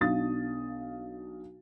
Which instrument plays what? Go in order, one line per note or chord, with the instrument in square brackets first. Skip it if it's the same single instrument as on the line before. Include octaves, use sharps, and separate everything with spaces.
[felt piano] B1 D4 F5 D#6 A6